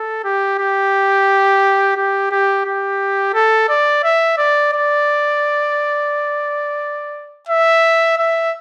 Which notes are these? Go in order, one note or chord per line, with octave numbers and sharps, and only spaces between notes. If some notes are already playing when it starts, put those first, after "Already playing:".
Already playing: A4
G4
G4
G4
G4
G4
A4
D5
E5
D5
D5
E5
E5